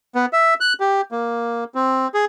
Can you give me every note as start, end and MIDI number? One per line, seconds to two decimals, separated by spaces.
0.15 0.26 59
0.33 0.54 76
0.60 0.73 90
0.80 1.01 67
1.12 1.64 58
1.75 2.08 60
2.14 2.25 68